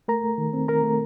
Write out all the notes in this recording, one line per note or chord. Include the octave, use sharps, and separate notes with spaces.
A3 A#4 A#5
A3
D#3
C4
D#3 A#4 A#5
A3